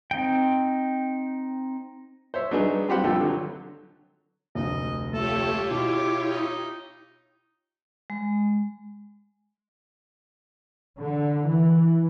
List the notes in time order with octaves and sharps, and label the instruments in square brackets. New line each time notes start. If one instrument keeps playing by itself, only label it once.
[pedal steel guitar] C4 D#4 G5
[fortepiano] C5 C#5 E5
F#3 B3 D4 D#4 G#4 B4
C4 F4 G4 C5 F#5 B5
A#1 D3 C4 F4 G4 A4
D3 F#3
[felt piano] F1 D2 [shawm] D#5
[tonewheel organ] A3 [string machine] F4 G4 C#5 [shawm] A4
[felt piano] B2 [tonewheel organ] E4 [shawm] D6
[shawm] D#4
[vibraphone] G#3
[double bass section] D3
E3